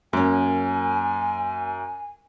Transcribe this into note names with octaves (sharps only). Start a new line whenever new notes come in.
F#2 A#3 C#4 G#5